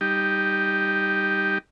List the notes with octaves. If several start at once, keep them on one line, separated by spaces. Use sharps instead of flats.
G3 D#4 G4